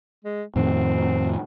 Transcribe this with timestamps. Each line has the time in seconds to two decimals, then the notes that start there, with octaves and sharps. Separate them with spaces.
0.25 G#3
0.56 F2 A2 D#3 C4